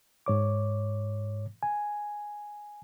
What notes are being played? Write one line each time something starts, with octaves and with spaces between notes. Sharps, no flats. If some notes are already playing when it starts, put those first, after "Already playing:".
G#2 C#5 D6
G#5